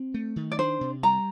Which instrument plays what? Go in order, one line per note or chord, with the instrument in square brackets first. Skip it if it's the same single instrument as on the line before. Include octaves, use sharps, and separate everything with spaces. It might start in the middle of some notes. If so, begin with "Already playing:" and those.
Already playing: [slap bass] C4
A3
D#3
[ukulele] D5
[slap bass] D4 [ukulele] C5
[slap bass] C3
[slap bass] G3 [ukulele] A#5